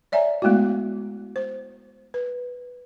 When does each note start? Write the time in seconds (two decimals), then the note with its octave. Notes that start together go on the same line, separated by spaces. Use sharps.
0.12 C#5 D5 E5 G#5 A#5
0.42 G#3 A3 B3 E4 F#4
1.36 C5
2.14 B4